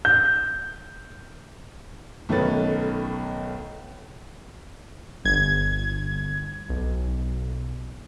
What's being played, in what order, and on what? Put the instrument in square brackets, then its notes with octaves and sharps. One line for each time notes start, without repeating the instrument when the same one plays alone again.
[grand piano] G6
B1 D#3 A3 C#4 B4 A6
[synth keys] G1 G#6
B1